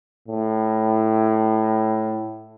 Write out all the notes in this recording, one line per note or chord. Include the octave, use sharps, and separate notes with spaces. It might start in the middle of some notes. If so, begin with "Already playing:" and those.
A2